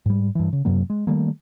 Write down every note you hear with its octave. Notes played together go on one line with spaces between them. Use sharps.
G#2 G3
G2 E3
C#3
F#2 C3 F#3 A#3
G#3
D#3 G3 A3 A#3